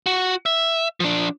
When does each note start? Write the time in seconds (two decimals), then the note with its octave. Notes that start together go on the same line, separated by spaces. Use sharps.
0.06 F#4
0.46 E5
1.00 F3 D4